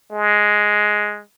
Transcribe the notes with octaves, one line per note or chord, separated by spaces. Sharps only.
G#3